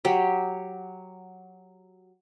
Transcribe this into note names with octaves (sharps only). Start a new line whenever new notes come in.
F#3 G4